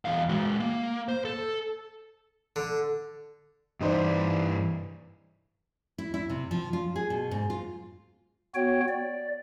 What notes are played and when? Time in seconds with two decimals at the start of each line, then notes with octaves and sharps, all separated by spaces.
0.05 E2 F5
0.29 G#3 F#4
0.60 A#3
1.09 C5
1.25 A4
2.56 D3
3.81 G2 E3 D#4 E4 C5 D5
5.98 E4
6.14 E4
6.29 C3
6.51 F3
6.73 F4
6.96 G#4
7.10 B2
7.31 G#2
7.50 F4
8.55 B3 F#4 C#5 G5
8.88 D5